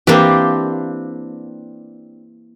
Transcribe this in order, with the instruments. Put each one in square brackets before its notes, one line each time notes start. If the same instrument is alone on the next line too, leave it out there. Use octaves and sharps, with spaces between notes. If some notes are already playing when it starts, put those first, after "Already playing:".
[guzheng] E3 A#3 [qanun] C4 D4 G4